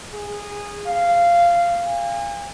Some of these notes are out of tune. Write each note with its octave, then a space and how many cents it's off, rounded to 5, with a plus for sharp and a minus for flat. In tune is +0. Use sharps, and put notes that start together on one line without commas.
G#4 -15
F5 -15
G#5 -40